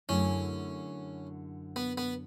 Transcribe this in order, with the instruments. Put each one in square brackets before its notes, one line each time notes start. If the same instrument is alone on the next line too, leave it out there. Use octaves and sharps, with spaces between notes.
[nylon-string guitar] F#2 D3 A3 E4 G#4 [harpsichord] C#4
[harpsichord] B3
B3